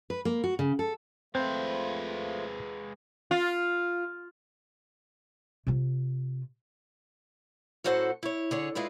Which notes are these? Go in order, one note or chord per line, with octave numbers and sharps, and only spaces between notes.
B4
A#3
F#4
C#3
A4
F3 G#3 A3 C4 F4 B4
F4
C3 F4
F#2 A2 F#4 A4 C5 F#5
E4 C#5
D3 G#4 C#5
G#3 E4 F4 B4